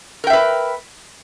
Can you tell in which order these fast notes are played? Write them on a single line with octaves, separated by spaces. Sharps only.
A#4 G5 E5 B4